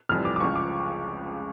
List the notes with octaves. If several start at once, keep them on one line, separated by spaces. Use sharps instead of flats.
F1 F2 E3 G3 F6
D6
D6
C#2 C#3 F3 C#6
D6